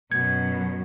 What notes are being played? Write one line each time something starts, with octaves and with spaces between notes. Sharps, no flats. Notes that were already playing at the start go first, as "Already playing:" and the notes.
F#2 B2 G#6